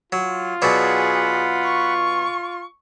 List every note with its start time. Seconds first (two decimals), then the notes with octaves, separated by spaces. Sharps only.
0.12 F#3 F4
0.62 B2 F#3 G#4 D5 F#5 B5
1.64 C#6